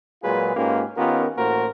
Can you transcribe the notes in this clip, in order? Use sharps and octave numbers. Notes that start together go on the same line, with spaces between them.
A#2 F#3 G#3 F4 G#4 B4
G#2 A#3 C#4 F4 G4 B4
D#3 B3 C#4 F4 G4 A#4
A1 A2 A#3 F#4 A#4 C5